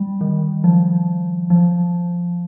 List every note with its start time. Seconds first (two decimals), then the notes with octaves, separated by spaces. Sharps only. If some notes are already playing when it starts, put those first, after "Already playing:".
Already playing: G3
0.21 D#3
0.64 F3
1.50 F3